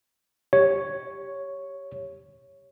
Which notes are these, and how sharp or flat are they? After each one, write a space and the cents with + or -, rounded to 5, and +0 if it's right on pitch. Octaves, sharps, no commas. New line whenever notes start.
G4 +0 C#5 +0